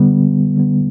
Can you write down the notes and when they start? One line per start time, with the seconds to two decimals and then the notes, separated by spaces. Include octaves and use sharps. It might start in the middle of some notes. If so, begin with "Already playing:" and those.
Already playing: D3 G3 B3
0.56 D3 G3 B3